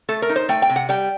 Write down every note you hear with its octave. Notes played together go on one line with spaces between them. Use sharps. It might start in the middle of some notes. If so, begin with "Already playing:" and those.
A3 A4
A#4
D#4
C5
A3 G5
G5
C3
F#5
G3 G5